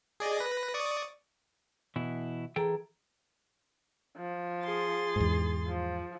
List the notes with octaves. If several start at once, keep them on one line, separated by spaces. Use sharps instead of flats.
G#4 D5 D#5
B4 A#6
D5 C#6 D#6
B2 E3 E4
E3 G#4 A4 G5 A#5
F3
G#4 C6 A6
E2 G#2
F3